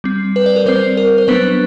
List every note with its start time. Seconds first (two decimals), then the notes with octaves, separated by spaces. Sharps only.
0.04 G3 C4
0.36 B4
0.46 D5
0.56 A#4
0.66 G3 C4 C5
0.97 A#4
1.18 C5
1.28 F#3 B3 D4 B4